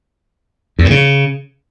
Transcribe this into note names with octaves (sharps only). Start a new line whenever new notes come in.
E2
A2
C#3